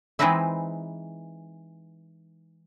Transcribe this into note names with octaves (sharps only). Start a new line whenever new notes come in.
E3 G#3 C4 D#4 B4 E5